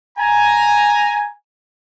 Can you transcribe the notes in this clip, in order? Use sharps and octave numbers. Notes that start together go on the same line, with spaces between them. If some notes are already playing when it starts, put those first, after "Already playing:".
G#5 A#5